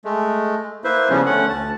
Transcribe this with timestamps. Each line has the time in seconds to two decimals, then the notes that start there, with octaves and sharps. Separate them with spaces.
0.05 G#3 A3
0.84 A#3 E4 B4 C5 E5
1.09 C#3 F3 G3 B3 C#4
1.26 D3 A3 C#4 F#5
1.49 D2 A5